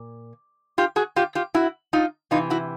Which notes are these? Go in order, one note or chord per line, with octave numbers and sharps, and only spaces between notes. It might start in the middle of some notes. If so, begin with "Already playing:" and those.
Already playing: A#2
F4 G4
F#4 G#4
F4 G4
F4 G4
E4 F#4
D#4 F4
C3 E3 D#4 F4
E4 F#4